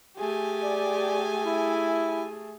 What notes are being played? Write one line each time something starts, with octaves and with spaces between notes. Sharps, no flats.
A3 G4 G#4 G#5
D5
E4